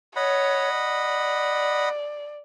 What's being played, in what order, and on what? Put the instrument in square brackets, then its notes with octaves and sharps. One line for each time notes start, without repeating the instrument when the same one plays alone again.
[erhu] C#5 [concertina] D#5 F#5 B5
[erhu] D5